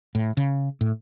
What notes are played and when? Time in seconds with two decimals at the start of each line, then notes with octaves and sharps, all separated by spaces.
0.15 A2
0.37 C#3
0.81 A2